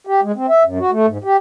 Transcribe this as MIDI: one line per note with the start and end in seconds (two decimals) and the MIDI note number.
0.07 0.21 67
0.23 0.32 56
0.36 0.46 60
0.49 0.63 76
0.64 0.79 42
0.79 0.91 66
0.91 1.06 57
1.07 1.18 44
1.24 1.37 67